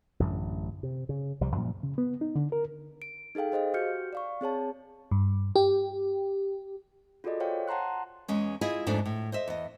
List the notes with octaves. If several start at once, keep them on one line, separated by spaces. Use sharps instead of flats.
A1 F#2 D3 A3
C3
C#3
C2 C3 F3 G3
F#2 A#2 F3 G3
C#3
B3
D#4
D3
A#4
D7
D#4 G#4 A4 F5 G5
G#4 C5 D#5 F5
F#4 G4 F6 G6 C#7
D5 F5 C#6
C4 G#4 C#5 A5
G2
G4
F4 F#4 G#4 A4 D5 D#5
C5 C#5 F5 G5
F#5 A5 A#5 C6 F#6
E2 G#3 C#4
E4 F4 G#4 D#5
F2 G#2 F3 A3 D4 D#4
A2
C5 D#5 E5
E2 D#5